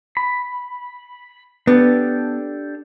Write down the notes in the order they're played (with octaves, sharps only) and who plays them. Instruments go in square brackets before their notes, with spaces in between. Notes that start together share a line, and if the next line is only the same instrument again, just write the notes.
[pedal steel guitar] B5
[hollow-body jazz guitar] B3 [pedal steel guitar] D4 G4 A4